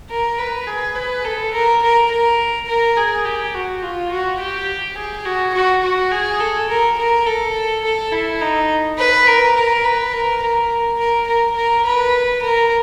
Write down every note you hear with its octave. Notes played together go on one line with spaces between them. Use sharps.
A#4
B4
G#4
B4
A4
A#4
A#4
A#4
A#4
G#4
G4
F#4
F4
F#4
G4
G#4
F#4
F#4
F#4
G#4
A4
A#4
A#4
A4
A4
E4
D#4
B4
A#4
A#4
B4
A#4
A#4
A#4
A#4
A#4
B4
A#4